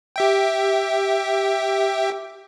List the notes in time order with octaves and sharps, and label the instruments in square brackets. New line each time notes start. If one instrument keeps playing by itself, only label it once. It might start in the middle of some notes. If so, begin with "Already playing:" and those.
[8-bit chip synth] G4 E5 G5